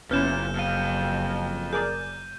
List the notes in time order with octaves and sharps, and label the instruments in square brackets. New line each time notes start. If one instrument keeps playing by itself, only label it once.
[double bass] F#1 [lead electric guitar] A#2 [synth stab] B3 C#4 E4 [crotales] F6 G6 E7
[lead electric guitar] F2 F5 [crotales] F6 D#7
[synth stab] G#4 A#4 D5 [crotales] G6